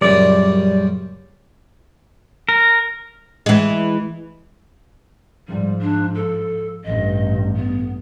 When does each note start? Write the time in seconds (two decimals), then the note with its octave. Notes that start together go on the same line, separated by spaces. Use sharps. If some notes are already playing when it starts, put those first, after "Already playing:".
0.01 F#2 A#2 C#3 G3 D5
2.49 A#4
3.46 E3 G#3
5.48 G#2 F3 G3
5.81 D4
6.15 A4
6.85 A1 G2 D#5
7.56 B3